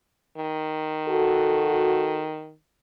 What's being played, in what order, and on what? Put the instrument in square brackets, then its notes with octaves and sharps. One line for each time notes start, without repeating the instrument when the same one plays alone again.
[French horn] D#3
[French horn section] F#4 A4